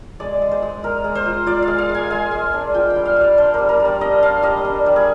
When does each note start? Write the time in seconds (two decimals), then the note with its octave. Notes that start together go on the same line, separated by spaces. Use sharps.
0.20 G#3 D5
0.42 G#3
0.51 C5
0.62 G#3
0.83 G#3 A#4
1.04 G#3
1.15 C5
1.26 F4
1.46 F4 D5
1.62 F5
1.68 G#3
1.78 F5
1.89 G#3
1.94 G#5
2.10 G#3 G#5
2.31 G#3
2.53 D4
2.74 F4 G5
2.90 G5
2.96 G3
3.05 F5
3.16 G3 D5
3.37 D4 C5
3.54 G3 A#4
3.69 A#4
3.80 G3
3.85 D5
4.01 D4 D#5
4.22 D4 F5
4.43 G3 D#5
4.65 D4
4.86 G3
4.96 G#4